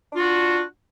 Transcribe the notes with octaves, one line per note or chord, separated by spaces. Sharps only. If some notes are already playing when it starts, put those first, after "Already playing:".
D4 F4 F#4